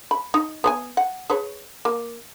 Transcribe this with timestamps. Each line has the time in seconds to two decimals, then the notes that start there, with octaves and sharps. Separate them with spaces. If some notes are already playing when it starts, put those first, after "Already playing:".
0.11 B5
0.34 D#4
0.64 B3 C#5 G#5
0.97 F#5
1.30 G#4 B4 C#5
1.85 A#3